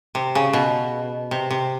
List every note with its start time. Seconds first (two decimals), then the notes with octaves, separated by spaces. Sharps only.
0.15 C3
0.35 C#3
0.53 B2
1.31 C3
1.50 C3